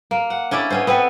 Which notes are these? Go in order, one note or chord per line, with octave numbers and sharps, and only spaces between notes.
A#3
F#5
C#4 D4 E4 D5
B3 C#4 C5
B3 C4 A4 B4